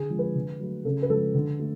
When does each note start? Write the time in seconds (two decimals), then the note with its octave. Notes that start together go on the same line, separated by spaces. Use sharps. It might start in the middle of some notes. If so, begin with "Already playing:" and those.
Already playing: D3 G#4
0.10 F3 G#3
0.19 B4
0.35 D3
0.60 F#3 A3
0.85 C#3 A4
1.02 B4
1.10 F3 G#3 A4
1.35 D3
1.59 A3